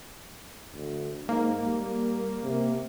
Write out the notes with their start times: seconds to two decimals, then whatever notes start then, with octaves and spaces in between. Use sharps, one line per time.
0.73 D2
1.29 G#2 A#3
1.66 G3
2.43 C3